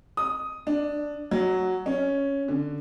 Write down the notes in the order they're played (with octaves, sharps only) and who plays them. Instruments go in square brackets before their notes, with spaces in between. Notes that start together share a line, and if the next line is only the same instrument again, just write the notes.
[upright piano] D#6
D4
F#3
C#4
D3